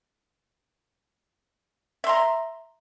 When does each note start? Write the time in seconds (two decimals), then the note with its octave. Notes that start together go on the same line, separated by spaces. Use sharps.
2.04 E5
2.07 C6
2.09 A#5